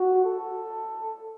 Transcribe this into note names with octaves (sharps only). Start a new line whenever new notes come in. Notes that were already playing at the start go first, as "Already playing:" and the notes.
Already playing: F#4
A4